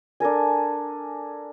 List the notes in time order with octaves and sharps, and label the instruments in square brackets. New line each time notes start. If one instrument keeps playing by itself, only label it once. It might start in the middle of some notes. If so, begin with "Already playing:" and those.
[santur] D4 A4 A#4 G#5